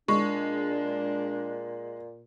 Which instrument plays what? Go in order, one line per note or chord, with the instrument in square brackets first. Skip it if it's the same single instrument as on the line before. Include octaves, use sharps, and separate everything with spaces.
[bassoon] A#2 [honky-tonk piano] G#3 [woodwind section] D4 [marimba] C#6